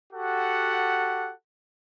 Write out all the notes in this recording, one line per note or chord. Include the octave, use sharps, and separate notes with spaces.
F#4 G4 A4 F#5